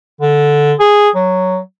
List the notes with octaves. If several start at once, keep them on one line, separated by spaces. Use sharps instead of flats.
D3
G#4
F#3